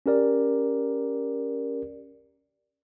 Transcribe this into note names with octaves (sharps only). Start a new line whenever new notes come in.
C#4 G4 A#4 D5